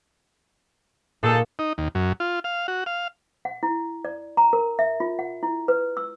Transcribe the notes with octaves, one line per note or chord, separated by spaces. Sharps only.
A#2 D#4 G#4 A4
D#4
D#2
F#2
F4
F5
F#4
F5
F#5
E4
D5
A#5
A#4
E5
F4
F#5
E4
B4
E6